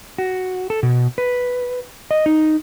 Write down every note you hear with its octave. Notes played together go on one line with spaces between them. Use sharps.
F#4
A4
B2
B4
D#5
D#4